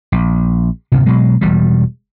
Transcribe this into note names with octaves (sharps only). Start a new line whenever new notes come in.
A#1
D1 G1 C3
B2 F#3 G#3
E1 E2 B2 G3